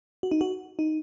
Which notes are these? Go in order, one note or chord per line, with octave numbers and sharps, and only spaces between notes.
F#4
D#4
F#4
D#4